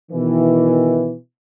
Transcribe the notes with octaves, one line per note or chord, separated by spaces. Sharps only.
B2 D#3 E3